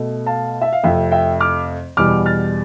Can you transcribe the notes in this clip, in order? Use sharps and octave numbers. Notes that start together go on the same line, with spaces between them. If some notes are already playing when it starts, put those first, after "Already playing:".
Already playing: B2 A3
F5 A5
E5
F5
F2 C3 F3 A3 E5 G5
E5 G5
D6 F6
E2 B2 G3 D6 F6
F6 A6